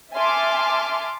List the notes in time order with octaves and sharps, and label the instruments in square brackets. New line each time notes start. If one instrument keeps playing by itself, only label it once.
[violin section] E5 G#5 A5 C6 D6 F6